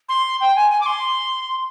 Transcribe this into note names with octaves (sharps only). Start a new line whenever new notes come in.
C6
G5
G#5
G#5
D6
C6